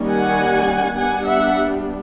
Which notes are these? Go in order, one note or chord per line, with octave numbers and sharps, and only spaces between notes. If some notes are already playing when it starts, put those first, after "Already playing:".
Already playing: D#3 G3 A#3 C#4
F#5 G#5
G3 B3 D4 F#5 G#5
E5 F#5